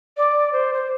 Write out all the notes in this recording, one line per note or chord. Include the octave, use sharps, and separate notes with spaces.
D5
C5
C5